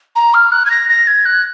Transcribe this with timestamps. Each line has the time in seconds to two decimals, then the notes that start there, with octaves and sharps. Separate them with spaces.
0.15 A#5
0.34 F6
0.51 F#6
0.65 G#6
0.70 A#6
0.89 A#6
1.07 G#6
1.25 F#6